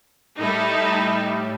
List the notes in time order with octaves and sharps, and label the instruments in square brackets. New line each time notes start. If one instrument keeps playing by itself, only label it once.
[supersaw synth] A2 G3 [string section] D#4 E4 A4